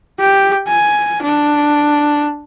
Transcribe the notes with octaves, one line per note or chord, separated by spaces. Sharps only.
G4
G#5
D4